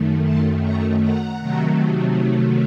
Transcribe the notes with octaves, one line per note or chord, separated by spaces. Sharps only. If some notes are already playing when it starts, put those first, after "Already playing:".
Already playing: F#2 D#3 A3
A5 C6
A#5 C#6
F#5 A#5
C3 D#3 F#3 A3